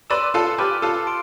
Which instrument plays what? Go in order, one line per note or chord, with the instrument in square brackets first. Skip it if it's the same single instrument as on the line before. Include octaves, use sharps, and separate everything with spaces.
[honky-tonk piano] B4 D5 [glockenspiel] C6 E6 A6 E7
[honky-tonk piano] F4 A4
[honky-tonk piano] G4 B4 [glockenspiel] D6 F6 A6
[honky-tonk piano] F4 A4
[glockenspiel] C6 D7